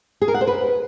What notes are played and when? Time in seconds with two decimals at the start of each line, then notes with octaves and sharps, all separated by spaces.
0.22 G#4
0.28 A#4
0.34 F#5
0.41 C5
0.47 B4